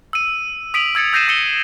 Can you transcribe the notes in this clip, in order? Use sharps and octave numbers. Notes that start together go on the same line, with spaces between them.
E6 D#7
D#6 B6 D7 D#7 F7 F#7
E6 G#6 A6 C#7
E6 G6 A#6 C7 D#7 E7
D#6 G6 C#7 D#7 E7 G7